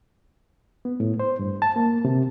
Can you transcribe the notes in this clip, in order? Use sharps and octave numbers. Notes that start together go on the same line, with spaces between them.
B3
A2
C5
G2
A5
A#3
C3